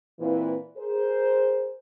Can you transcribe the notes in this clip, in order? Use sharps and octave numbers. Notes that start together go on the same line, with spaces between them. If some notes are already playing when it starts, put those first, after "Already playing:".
A#2 E3 C4 E4 F4 B4
G#4 A#4 C5